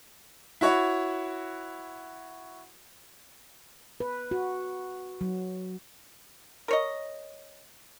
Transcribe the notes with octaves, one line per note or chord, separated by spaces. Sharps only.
E4 F#4 C#5
B4
F#4
F#3
A#4 C#5 D#5